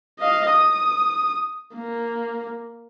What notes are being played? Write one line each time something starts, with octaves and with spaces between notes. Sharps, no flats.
D#5 F5
D#6
A#3